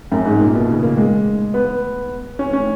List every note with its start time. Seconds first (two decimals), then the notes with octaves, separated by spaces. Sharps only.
0.12 F#2
0.25 G#2
0.40 A#2
0.54 B2
0.69 C#3
0.83 A#3
0.97 G#3
1.54 B3
2.39 C#4
2.53 C#4